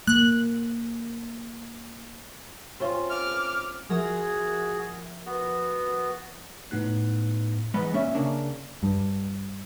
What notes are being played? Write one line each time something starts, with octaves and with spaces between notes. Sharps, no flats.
A#3 F#6
C4 C#4 F4
D6 F6
F3 F#4 G#4 A#4 E5
B3 F#4
A2 B3 D#4 F#6
E2 G#2 B3 B4 D#5
A#2 C#4 E5
C#3 A#3 D4
G2